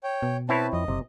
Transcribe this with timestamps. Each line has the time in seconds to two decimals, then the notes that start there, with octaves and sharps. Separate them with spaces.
0.04 C#5 G5
0.23 B2
0.49 C4 E4 B4 C#5 A5
0.73 F2 D#5
0.88 F#1 C3